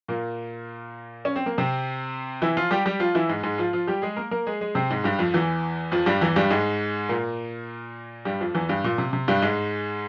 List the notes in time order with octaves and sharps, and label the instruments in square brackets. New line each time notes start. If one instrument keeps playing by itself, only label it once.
[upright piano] A#2 A#3
C#4
C4
A#3
C3 C4
E3 E4
F3 F4
G3 G4
G3 G4
F3 F4
E3 E4
G#2 G#3
G#2 G#3
F3 F4
F3 F4
G3 G4
G#3 G#4
A#3 A#4
A#3 A#4
G#3 G#4
G#3 G#4
C3 C4
G#2 G#3
G2 G3
F2 F3
E2 E3
F2 F3
G2 G3
E2 E3
G2 G3
G#2 G#3
A#2 A#3
G2 G3
F2 F3
E2 E3
G2 G3
A#2
C3
C3
G2 G3
G#2 G#3